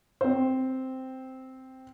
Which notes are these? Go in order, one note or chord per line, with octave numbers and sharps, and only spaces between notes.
C4 C5